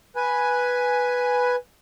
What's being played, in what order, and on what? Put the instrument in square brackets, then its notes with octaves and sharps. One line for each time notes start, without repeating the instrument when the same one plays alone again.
[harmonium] B4 G#5